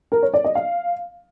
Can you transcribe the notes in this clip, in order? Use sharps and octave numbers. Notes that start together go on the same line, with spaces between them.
A#4
C#5
D5
D#5
F5